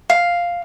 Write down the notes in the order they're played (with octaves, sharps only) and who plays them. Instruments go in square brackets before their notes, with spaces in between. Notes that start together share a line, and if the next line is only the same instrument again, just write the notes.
[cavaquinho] F5